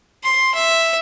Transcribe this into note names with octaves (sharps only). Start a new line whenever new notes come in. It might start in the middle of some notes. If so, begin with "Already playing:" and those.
C6
E5